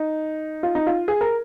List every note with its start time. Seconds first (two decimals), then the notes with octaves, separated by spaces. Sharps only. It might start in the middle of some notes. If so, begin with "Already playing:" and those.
Already playing: D#4
0.63 F4
0.75 D#4
0.87 F4
1.08 G#4
1.21 A#4